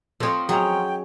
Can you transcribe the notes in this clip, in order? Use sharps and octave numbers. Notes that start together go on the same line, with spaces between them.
F3 C4 A4 C#5 D#5
F#3 C#4 D#4 G#4 G5